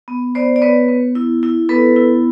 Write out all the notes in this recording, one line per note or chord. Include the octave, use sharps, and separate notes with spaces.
B3
B3 C5 D5
D5
B3 B4 C#5
B3
E4
E4
B3 A4 B4
E4